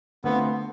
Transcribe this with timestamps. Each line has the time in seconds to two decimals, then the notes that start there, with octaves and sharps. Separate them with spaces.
0.24 D3 A3 B3 C4 F4